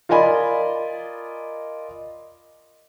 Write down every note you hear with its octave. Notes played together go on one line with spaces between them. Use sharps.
F4 A#4 D5 D#5 G#5 B5